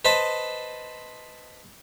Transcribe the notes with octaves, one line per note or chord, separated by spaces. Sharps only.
B4 C5 D#5 A5 B5